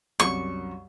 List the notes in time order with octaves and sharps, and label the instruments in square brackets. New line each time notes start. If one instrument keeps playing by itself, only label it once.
[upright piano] C2 F#2 [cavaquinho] C#6